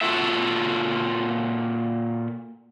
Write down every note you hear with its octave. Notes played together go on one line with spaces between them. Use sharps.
A#2 F4 F#4 A4 E5